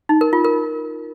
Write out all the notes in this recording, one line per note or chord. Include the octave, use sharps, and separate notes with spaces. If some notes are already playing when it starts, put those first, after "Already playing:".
D#4
A#4
F4
A#4